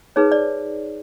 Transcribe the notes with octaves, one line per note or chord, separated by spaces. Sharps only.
D#4 G#4 B4 C#5
D5